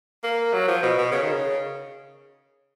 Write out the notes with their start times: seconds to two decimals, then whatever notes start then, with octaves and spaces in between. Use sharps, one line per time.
0.23 A#3
0.53 F#3
0.68 F3
0.83 B2
0.98 B2
1.11 C#3
1.22 D#3
1.32 C#3